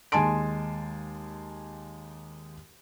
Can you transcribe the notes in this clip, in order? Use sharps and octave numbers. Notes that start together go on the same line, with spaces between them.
D#2 G#3 G#5 A5 C6 D7